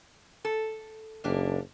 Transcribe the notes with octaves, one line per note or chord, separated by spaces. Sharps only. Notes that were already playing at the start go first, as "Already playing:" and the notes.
A4
F#1 A#3 D4 G4